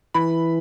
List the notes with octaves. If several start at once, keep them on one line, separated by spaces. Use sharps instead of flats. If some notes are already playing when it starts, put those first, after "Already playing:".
E3 B5